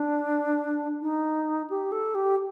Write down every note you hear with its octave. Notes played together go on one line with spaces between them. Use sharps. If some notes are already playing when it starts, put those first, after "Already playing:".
Already playing: D4
D#4
G4
A4
G4